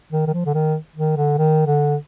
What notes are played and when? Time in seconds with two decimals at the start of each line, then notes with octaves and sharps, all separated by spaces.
0.12 D#3
0.27 D#3
0.33 F3
0.46 D3
0.54 D#3
0.96 D#3
1.17 D3
1.38 D#3
1.66 D3